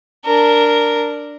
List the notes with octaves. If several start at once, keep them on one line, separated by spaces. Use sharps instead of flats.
D4 A#4